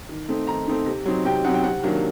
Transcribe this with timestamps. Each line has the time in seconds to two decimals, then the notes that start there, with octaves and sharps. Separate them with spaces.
0.09 D#3
0.29 A3 C4 D#4
0.47 D#3 A#5
0.68 A3 C4 D#4
0.86 C3
1.05 F#3 C4 D#4
1.25 C3 G5
1.45 F#3 C4 D#4 F#5
1.54 G5
1.63 C3 F#5
1.83 D#3 F#3 A#3 D4